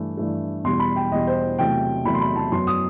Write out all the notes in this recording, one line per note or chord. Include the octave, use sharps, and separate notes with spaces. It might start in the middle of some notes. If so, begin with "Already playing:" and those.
Already playing: G2 E3 A3
G2 E3 A3
E2 B2 G3 C6
B5
G5
E2 B2 G3 D#5
C5
E2 C3 F#3 A3 G5
E2 C3 F#3 A3 B5
C6
B5
A5
F#2 F#3 B3 C6
D#6